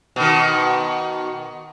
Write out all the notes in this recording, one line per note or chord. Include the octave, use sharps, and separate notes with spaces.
B2 D#3